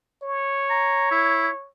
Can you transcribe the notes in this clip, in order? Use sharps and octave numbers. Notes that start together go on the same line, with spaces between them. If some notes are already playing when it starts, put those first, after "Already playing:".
C#5
A#5
E4